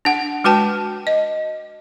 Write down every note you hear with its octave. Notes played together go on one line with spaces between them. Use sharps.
D4 F#5
G#3 F#4 B4 G5 A5
D#5